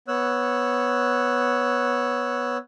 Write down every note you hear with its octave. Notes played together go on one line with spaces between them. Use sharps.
B3 C#5 E6 F#6